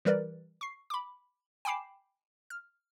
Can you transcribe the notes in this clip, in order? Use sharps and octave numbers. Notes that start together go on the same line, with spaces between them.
E3 G3 A#4 B4 D5
C#6 C7
B5 D6
G5 G#5 B5 D6 C7 E7
F6